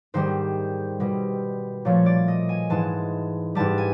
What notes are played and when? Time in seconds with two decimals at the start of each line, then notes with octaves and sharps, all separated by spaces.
0.14 G#2 D#3 G3 C5
1.00 B2 G3
1.85 A#2 F3 A3 C#5
2.06 D5
2.28 D#5
2.49 G#5
2.70 G#2 E3 G#3 A5
3.55 G#2 E3 G3 A5
3.78 G#5